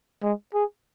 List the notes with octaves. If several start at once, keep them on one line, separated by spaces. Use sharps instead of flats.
G#3
G#4